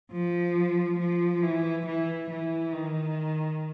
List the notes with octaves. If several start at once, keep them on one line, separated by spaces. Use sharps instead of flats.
F3
F3
E3
E3
E3
D#3